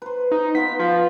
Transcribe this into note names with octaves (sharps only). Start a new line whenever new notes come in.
B4 C5
D#4
B3 F4 B6
F3